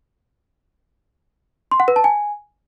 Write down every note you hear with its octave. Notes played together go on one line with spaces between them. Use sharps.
C6
F#5
B4
A5
G#5